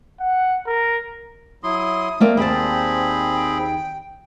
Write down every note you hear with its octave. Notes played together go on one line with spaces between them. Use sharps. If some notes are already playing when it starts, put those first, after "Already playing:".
F#5
A#4
F#3 E4 C6 D#6
A3 A#3 C4 D5
D#2 C4 G#4 C5 D5 A5 B5
G5